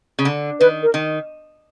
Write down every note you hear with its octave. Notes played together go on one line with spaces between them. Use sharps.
C#3
D3
D#3 B4
A#4
D#3